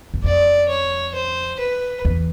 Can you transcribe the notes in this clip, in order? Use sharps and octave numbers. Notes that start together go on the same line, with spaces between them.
E2
F2 D5
C#5
C5
B4
E2